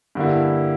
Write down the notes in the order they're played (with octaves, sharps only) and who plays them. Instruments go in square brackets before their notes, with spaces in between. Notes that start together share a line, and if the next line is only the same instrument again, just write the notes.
[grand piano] G2 D3 A#3 E4